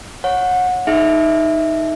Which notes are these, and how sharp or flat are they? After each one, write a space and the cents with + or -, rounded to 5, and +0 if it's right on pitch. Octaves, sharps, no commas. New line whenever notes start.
C#5 +0 F#5 -25
D#4 +5 G#4 +25 E5 +0